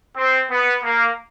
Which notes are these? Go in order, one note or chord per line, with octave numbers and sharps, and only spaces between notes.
C4
B3
A#3